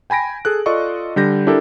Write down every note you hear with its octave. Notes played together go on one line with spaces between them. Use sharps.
G5 G#5 B5 A#6 D7
G#4 A4 F#6
F4 A4 D5 D#5 C6 C#6
D3 G3 G6 A#6
D4 E4 G4 A4 A#4